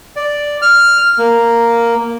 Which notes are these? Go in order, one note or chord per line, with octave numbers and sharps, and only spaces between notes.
D5
F6
A#3